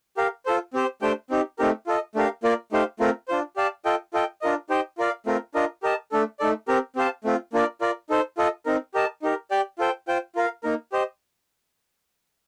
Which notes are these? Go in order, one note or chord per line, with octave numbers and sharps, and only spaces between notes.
G4 A#4 F5
F4 A4 C5
C4 G4 C5
A3 D4 G4 C5 G5
C4 D#4 G4
A3 C4 D#4 G4 A#4
F4 A4 D#5
A3 D4 G4 A#4 F5
A#3 F4 A#4 D5
A3 D#4 G4 C5 F5
A3 C4 F4 A#4
D4 F4 C5
G4 D5 F5 A5
F4 A4 D#5 G5
F4 A4 D#5 G5
D4 F4 A#4 D#5
D#4 G4 C5 D#5 G5
F4 A#4 D5 F5
A3 C4 F4 A#4
D4 F4 A#4 D#5
G4 A#4 D#5 A5
A3 D4 A4
A3 D#4 A4 D5
C4 G4 A#4
C4 G4 C5 F5 A5
A3 C4 F4
A#3 D4 F4 A#4 D5
F4 A#4 D5
D#4 A4 C5
F4 A4 D#5
C4 D#4 A#4
G4 A#4 D#5 A5
D#4 G4 A#4
G4 D5 G5
F4 A4 C5 G5
F4 C5 G5
F4 A#4 F5
A#3 D#4 A#4
G4 C5 D#5